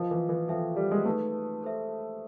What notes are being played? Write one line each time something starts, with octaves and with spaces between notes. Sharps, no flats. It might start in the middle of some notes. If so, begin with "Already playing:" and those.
Already playing: F3 F4 A#4 D#5
E3
E3
F3 F#4 A4 C5 E5 G5
G3
G#3
A3 D#4 G#4 B4
A4 C5 E5